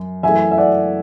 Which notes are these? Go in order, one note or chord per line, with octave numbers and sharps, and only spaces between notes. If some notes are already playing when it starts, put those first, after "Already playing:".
Already playing: F#2
F#2 E3 A3 E5 G#5
E5
D5 F#5